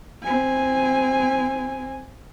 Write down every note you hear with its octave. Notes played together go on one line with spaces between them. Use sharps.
C4 G#5